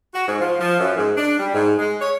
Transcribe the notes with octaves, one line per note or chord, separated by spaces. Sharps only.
F#4
G#2
F3
F3
F#2
G#2
D4
G3
G#2
G#3
C#5